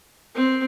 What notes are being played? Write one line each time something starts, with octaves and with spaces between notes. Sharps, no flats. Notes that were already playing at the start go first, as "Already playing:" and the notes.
C4